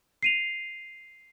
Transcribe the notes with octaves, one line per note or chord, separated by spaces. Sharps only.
C7 D#7 F7